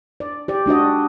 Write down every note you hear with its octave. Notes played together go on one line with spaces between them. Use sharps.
D5
G4 D5
G#3 D4 F#4 D#5